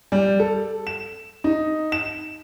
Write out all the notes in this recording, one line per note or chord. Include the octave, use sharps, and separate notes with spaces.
G3
A4
E7
D#4
E7